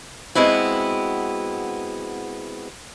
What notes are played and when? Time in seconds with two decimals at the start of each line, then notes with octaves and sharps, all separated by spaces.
0.35 G#3 B3 C4 E4 F#4